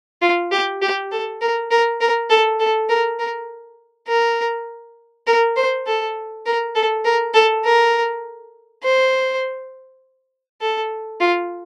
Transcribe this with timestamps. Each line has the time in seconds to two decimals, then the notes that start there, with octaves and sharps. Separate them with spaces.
0.22 F4
0.52 G4
0.82 G4
1.12 A4
1.41 A#4
1.71 A#4
2.01 A#4
2.30 A4
2.60 A4
2.89 A#4
3.19 A#4
4.08 A#4
5.27 A#4
5.57 C5
5.86 A4
6.46 A#4
6.75 A4
7.05 A#4
7.34 A4
7.65 A#4
8.83 C5
10.61 A4
11.20 F4